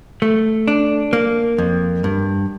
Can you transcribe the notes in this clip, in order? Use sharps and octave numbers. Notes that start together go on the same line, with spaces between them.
A3
D4
A#3
F2
G2